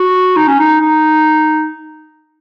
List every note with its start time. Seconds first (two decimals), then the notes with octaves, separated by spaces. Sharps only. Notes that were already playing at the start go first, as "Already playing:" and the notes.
Already playing: F#4
0.36 D#4
0.47 C#4
0.59 D#4
0.80 D#4